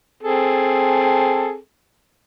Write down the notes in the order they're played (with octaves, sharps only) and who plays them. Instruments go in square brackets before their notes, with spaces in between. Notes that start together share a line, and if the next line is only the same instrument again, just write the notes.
[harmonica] C4 G#4 A4